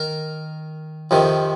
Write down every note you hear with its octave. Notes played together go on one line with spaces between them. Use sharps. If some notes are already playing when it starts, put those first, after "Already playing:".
Already playing: D#3 A#4
F2 C3 D#3